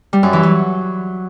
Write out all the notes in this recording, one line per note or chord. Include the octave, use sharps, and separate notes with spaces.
G3
F#2
E3
F#3